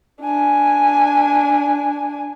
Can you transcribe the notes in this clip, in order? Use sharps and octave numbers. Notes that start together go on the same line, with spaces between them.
D4 G#5